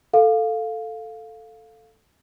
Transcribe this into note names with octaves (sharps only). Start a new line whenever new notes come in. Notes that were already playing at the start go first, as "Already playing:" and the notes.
A4 F5